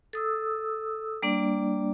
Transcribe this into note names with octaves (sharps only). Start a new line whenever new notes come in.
A4 D#6 E6
G3 A#3 D4 D5